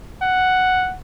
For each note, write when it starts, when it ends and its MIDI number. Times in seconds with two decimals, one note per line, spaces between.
0.22 0.95 78